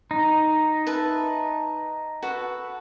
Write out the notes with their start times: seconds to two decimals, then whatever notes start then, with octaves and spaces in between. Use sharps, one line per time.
0.11 D#4
0.87 B4 E5 A5
2.22 F#4 A4 B4